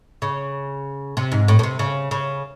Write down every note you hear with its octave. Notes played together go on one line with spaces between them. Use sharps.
C#3
C3
G#2
A2
A2
C3
C#3
C#3